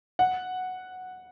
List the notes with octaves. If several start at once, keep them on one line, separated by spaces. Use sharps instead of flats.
F#5